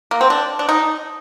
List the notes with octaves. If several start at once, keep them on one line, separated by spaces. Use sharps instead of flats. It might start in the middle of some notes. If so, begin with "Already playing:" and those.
A#3
C4
D4
D4
D#4